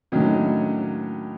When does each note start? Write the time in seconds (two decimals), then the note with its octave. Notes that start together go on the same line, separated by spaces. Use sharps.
0.12 D#2 A2 D#3 F#3 C#4 D4